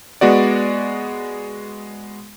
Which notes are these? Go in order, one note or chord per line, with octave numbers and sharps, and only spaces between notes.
G#3 B3 F#4 D5